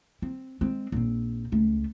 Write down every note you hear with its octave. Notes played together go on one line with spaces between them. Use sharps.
C4
G#3 C4
A#1 C4
C#2 A3